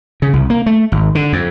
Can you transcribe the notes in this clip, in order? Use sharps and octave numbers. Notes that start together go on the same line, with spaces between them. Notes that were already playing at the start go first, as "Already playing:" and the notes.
C#3
C2
A#3
A3
G#1
D3
F2